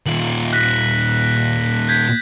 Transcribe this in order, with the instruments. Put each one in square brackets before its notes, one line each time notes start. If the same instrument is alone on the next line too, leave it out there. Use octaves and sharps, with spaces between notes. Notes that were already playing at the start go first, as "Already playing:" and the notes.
[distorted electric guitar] D#2 A#2 [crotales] F#7
[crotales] F#6 A#6 B6
G6 G#6 B6